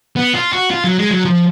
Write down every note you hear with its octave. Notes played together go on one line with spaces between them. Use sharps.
B3
F4
F#4
F4
F#3
G#3
F#3
F3